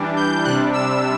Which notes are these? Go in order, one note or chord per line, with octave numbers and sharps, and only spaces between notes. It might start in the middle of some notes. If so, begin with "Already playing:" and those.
Already playing: E3 G3 D4
G6
C3 G3 D4 F#6
E6